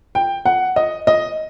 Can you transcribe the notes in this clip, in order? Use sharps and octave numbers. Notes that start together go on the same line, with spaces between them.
G5
F#5
D#5
D#5